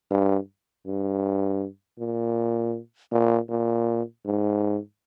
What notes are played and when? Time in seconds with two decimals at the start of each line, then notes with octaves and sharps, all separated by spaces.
0.11 G2
0.86 G2
1.99 A#2
3.12 A#2
3.49 A#2
4.25 G#2